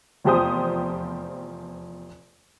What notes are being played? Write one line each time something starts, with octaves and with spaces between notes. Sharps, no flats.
F1 E2 F3 G4 C5 D#6